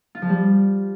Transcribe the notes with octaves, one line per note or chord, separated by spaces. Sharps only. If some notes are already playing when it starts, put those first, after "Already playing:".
F4
F3
G3